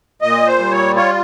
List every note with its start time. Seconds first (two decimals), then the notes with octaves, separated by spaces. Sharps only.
0.22 A#2 D#5
0.47 C5
0.59 G3
0.71 C#5
0.96 F4 C#5